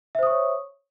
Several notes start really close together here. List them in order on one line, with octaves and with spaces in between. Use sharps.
E5 C5 D#6 C#6 C#5